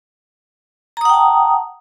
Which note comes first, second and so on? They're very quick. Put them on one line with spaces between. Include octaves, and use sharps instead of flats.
A#5 D#6 F#5 G5 A5